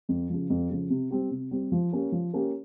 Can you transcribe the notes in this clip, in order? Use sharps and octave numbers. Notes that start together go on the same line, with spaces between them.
F2
C#3 F3
F2
C#3 F3
C3
G3 C4 G4
C3
G3 C4 G4
F3
A#3 C#4 G4
F3
A#3 C#4 G4